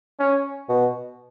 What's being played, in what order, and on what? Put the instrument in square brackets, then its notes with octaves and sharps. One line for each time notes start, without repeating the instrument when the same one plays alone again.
[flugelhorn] C#4
[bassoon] B2